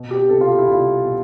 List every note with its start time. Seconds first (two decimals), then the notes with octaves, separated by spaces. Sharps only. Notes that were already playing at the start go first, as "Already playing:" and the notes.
Already playing: B2
0.11 G4
0.29 C2 A4
0.41 F4
0.49 G4
0.58 E4
0.67 C2 F4
1.05 B2